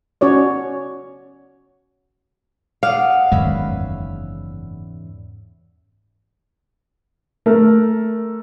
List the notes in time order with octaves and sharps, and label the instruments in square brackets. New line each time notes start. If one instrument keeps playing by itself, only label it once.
[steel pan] C#4 F#4 C#5 D5
[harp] D5 F#5 D#6 [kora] F5
[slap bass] F#1 D#3 G#3 [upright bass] E2 G#2 [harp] C#4 B4 E5
[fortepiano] A3 A#4